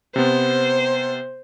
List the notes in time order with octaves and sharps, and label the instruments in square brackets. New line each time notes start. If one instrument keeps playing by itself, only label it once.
[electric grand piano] C3 B3 [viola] C5